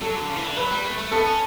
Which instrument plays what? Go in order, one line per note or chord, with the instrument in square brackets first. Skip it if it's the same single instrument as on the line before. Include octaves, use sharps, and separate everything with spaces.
[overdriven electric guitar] F#3 [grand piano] A4
[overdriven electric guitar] D3
C#3
E3
D3
[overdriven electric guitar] F#3 [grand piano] B4
[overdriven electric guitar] G3
A3
A3
[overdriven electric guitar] B3 [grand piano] A4
[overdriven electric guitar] C#4